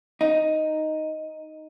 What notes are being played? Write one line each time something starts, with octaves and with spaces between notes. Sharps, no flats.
D#4